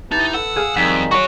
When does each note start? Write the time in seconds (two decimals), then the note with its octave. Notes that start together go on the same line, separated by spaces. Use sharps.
0.12 D#4 E4 G4 B4 A5
0.34 A4 B4 F#5 E6
0.56 G#4 F5
0.76 F2 D#3 G3 D#4 B6
1.11 F#4 C#5 C#6